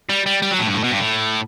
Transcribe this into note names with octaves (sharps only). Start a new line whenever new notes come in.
G3
G3
G3
F#3
A2
G2
A2
B2
G2
A2